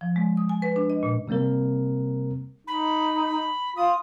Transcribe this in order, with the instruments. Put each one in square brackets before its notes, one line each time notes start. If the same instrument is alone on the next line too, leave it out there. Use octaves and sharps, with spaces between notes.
[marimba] F3
G#3
D#6
G#5
B4
D4
D#5
A#2
[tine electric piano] C3 G3 A#3 C4 A#4
[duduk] D#4 [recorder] B5
[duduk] F4 [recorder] D#6